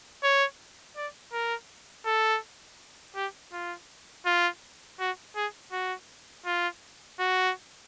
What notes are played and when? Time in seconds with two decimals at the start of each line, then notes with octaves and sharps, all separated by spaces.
0.23 C#5
0.96 D5
1.33 A#4
2.06 A4
3.16 G4
3.53 F4
4.26 F4
5.00 F#4
5.36 G#4
5.72 F#4
6.46 F4
7.19 F#4